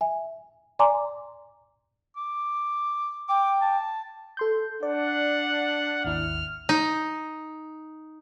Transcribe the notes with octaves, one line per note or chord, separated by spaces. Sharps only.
E5 G#5
D5 G#5 A#5 C6 D6
D6
G5 D6
A5
A4 C6 G6
D4 D5 F#5
G#1 D#2 E4 F6
D#4